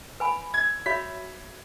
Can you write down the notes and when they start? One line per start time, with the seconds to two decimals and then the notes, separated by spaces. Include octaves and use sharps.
0.20 B4 G#5 B5
0.54 G#6
0.86 F#4 C#5 E5 B5 B6